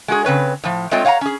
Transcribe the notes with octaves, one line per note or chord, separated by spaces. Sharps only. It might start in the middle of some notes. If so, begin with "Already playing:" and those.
G#3 F#4 G#4
C#3 C4 B4 C#5
A2 F3
G#3 A3 C4 F4 C#5 G5
C#5 F5 F#5 G#5 A#5
C#4 G#4